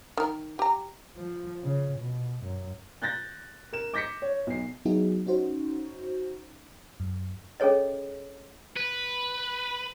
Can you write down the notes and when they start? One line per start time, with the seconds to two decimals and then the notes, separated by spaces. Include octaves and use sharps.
0.17 D#3 A#4
0.59 G4 A#5
1.16 F3
1.62 C#3
1.98 B2
2.43 F#2
3.02 F#6 G6 A6 A#6
3.73 A#4 E7
3.94 D6 G6 A#6 B6 C#7
4.22 C#5
4.47 B1 C7
4.85 F#3 B3 D#4 E4 F#4 G#4
5.26 C#4 D#4 F#4 C5
7.00 F#2
7.60 C#4 G#4 A4 C#5 D#5
8.77 B4